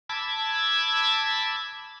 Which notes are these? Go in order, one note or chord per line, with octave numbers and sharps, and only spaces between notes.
A5 B5 D6 E6 G#6